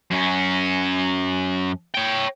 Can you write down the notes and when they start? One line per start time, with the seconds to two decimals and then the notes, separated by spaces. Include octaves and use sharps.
0.12 F#2 C#4
1.94 C#5 G5